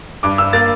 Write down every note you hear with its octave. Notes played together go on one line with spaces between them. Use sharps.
G2 D6
G2 E6
A#3 A6